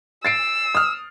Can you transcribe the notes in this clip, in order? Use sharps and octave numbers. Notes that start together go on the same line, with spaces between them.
E6 A6 C7 D7
D#6 F6